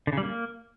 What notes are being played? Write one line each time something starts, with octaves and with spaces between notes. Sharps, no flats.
D3
C#3
G3
A#3